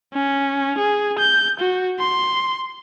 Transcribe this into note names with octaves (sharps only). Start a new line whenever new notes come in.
C#4
G#4
G6
F#4
C6